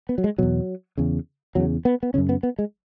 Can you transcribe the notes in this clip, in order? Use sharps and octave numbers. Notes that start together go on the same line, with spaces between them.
B3
F#3
G#3
E2 B2 F#3
E2 C#3
E2 C#3 F#3
B3
B3
F#2 C#3 C#4
B3
B3
G#3